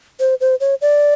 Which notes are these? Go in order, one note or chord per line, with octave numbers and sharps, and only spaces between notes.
C5
C5
C#5
D5